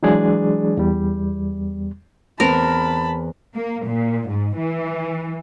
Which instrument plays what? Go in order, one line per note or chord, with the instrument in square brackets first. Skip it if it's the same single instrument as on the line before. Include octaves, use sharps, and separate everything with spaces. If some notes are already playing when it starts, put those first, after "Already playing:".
[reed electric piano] E3 F#3 G#3 D4 G#4 D5
E2 G3
[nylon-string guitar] E2 B3 C4 [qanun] A#4 [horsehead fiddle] A5 B5
[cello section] A#3
A#2
G#2
E3